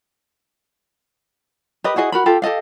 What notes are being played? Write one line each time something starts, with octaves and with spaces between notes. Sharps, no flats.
G4 A#4 B4 D#5
E4 F#4 G#4 D#5
F#4 A#4 B5
F4 G4 A4
G4 A4 D#5 F5